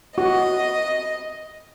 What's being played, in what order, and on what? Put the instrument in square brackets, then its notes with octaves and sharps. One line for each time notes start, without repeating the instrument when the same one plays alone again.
[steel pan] F#4 [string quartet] D#5